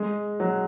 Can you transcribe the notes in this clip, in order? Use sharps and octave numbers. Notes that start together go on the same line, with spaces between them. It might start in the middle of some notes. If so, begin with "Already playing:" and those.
Already playing: G#3
F#3